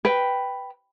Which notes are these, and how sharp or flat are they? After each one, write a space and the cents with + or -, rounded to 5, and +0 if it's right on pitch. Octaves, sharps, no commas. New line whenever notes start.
B4 +0 G5 +0